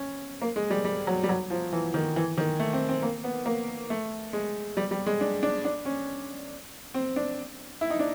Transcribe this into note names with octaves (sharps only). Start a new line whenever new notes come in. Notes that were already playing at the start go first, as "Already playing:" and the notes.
Already playing: C#4
A#3
G#3
G3
G3
F#3
G3
F#3
F3
E3
D#3
E3
D#3
A3
C4
C4
A#3
B3
A#3
A3
G#3
G3
G3
G#3
D4
D4
D4
C#4
C4
D4
E4
D#4
D4